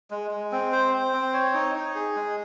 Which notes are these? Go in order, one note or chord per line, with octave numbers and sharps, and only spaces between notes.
G#3
G#3
C4
C5
C5
C4
C#5
D#4
D#4
G#4
G#3